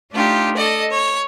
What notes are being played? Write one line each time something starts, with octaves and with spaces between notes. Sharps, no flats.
A3 D4 D#4 F4 G4
A4 D5 D#5
C#5